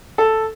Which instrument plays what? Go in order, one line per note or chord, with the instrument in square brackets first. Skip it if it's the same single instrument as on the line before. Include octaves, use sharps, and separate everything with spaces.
[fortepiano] A4